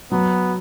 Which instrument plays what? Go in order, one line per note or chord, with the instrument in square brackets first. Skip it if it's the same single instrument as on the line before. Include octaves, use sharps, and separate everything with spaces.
[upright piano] F#3 [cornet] B3